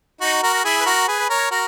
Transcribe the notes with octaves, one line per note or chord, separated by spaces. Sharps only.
D#4 F#4
F#4 A#4
A#4
E4 G#4
B4
F#4 A#4
G#4 B4
B4
A#4 C#5
F#4 A#4